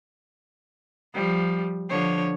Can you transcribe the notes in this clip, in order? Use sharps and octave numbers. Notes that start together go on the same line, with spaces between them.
F3 G3
D3 F3 C#5